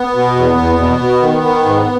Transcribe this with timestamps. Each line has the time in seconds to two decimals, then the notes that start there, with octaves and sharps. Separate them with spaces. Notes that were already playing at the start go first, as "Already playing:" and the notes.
Already playing: B3
0.15 B2
0.36 E2
0.57 E2
0.79 B2
1.00 B2
1.22 D#3
1.43 D#3
1.65 G#2